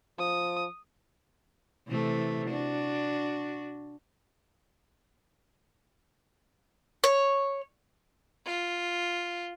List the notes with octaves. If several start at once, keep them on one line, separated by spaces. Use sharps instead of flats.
F3 D#6
C3 E3 A3
D4 F#4
C#5
F4